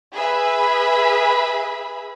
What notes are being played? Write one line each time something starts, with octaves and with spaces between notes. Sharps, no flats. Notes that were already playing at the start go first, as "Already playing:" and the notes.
G#4 B4 E5 B5